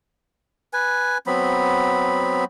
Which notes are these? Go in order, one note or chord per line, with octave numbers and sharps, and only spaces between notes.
B4 G#5
F#3 B3 C4 B5